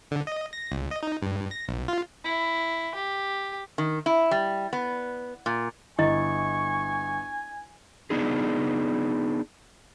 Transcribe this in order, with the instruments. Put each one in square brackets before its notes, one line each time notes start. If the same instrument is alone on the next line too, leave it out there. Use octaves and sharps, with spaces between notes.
[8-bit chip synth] D3
D#5
A#6
C#2
D#5
D#4
G2
A#6
B1
F4
[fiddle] E4
G4
[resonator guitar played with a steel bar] D#3
E4
G3
B3
A#2
[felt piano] G1 [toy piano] E4 D#5 [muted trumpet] G#5 [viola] C#6
[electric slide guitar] B3 D4 D#4 G#4